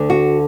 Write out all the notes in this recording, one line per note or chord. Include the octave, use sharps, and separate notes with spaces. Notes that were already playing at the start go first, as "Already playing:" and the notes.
Already playing: D2 D3
F#4